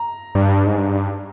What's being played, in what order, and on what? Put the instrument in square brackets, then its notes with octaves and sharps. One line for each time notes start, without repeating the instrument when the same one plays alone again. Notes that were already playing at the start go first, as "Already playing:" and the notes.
Already playing: [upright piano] A#5
[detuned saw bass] G2
G#2
G2